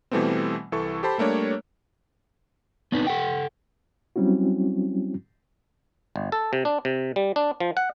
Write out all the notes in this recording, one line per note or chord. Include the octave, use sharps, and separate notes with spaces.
B2 E3 G3 A3 B3 C4
C2 E3 A4 C#6
G4 A4 C5 A5 B5
G3 A3 A#3 D4 C#5
B3 C4 D4 D#4 B4
A4 F#5 G5
F#3 G3 C4 C#4 E4 F#4
G1
A4
C3
D4
C3
G3
D4
F3
F#5